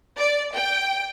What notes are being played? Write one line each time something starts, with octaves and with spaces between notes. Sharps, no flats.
D5
G5